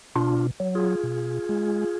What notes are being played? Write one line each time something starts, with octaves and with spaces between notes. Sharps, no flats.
B2 D4 F4
F#3
F4 G#4
B2
G#3